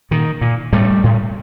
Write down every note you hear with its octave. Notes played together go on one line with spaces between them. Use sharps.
A#2 D#3
A#2
A2 G3 A3
A2